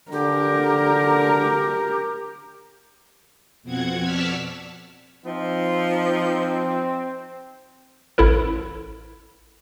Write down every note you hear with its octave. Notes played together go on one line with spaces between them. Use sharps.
D3 G4 A#4
F2 B2 C4 F#5 G#6
D5 A5 C#6 E6 F6 B6
F3 C4 D#4
A1 E4 A4 A#4